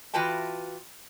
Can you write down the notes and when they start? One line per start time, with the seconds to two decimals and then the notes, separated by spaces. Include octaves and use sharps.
0.14 E3 F4 F#4 B4 G5 A5